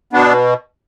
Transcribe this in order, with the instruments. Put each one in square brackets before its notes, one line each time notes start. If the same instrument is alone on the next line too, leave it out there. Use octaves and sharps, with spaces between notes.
[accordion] B2 B3 D4